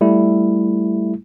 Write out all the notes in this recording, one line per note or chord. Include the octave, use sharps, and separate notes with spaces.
G3 A3 E4